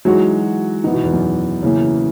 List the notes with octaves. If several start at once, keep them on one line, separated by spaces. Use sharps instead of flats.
E3 F#3 G#3 D#4 F#4
D#3 E3 B3 D#4
B2
E2
F#2
C#3 E3 A#3 C#4 E4